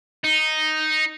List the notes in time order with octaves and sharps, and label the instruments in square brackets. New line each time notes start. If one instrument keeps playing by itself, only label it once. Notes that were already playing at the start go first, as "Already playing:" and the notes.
[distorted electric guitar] D#4